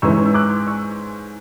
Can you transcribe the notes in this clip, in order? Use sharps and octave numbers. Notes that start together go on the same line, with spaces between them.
G#2 E3 G#3 C#4 C#6 E6
E6
D6 F#6
C#6 E6